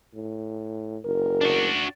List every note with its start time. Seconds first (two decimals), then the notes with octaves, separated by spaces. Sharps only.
0.14 A2
1.05 F#1 A#4
1.41 D4 F#4